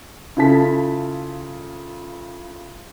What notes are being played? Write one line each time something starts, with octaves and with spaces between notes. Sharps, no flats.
C#3 E4 F4 A4 A5 B6